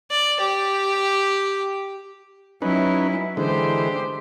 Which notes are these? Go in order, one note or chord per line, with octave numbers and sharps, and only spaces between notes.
D5
G4
F#3 C#4 D#4 E4 B4
D3 E3 G#3 G4 C5